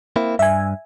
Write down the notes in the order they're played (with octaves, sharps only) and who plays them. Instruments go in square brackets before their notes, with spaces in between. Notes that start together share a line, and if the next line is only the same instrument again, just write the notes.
[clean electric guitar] A#3 C4 E4
[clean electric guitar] G2 [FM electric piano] E5 G#5